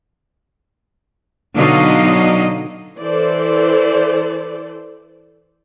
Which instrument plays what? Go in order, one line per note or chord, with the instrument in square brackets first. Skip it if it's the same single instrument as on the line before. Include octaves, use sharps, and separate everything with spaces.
[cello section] B2 D3 F#3 D#4 D#5 F5
[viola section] E3 A4 C5 D5